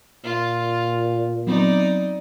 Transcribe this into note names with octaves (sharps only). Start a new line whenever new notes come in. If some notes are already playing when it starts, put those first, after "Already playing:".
A#2 F4
F#3 B3 C4 D#4 D5